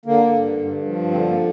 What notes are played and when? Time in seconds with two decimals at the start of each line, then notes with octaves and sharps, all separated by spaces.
0.05 D3 A#3
0.32 G2
0.58 G2
0.85 F3
1.11 D3 C4
1.29 A#3